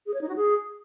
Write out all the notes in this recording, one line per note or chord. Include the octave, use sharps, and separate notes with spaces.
G#4
C#5
D#4
F#4
G#4